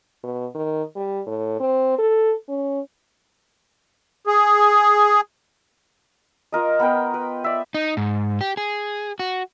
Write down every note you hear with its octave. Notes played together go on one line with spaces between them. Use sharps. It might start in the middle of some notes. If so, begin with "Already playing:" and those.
B2
D#3
G3
A2
C4
A4
C#4
G#4
F4 A#4 D#5
B3 A#4 G5
B4
D5 E5
D#4
G#2
G4
G#4
F#4